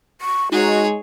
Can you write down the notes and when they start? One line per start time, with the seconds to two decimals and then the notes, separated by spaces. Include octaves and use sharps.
0.21 C#6
0.52 G#3 D#4 F#4 G#4 C#5